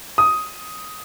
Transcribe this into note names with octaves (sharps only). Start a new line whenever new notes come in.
D#6